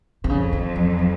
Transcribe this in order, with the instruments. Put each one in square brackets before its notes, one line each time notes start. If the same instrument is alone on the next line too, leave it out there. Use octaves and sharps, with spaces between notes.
[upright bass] C3
[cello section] F2 [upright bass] C#3
[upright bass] D#3
F3
F#3